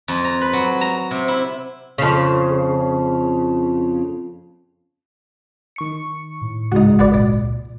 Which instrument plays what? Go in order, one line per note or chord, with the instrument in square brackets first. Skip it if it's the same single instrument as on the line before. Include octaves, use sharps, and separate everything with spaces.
[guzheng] F2
A#5
B4
F#3
A#5
C3
E4
[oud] F2 C#3
[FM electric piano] D#3 C#6 C#7
[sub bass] A2
[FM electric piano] C#2 G#2 G#3 [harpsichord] D#4 F#4
[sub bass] G1 [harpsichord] F#4 B4 D5
[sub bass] A#2 [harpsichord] D4